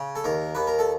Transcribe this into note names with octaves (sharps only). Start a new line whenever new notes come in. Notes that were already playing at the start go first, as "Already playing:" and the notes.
Already playing: C#3
A4
D#2 A#4
D#2 B4
A#4
A4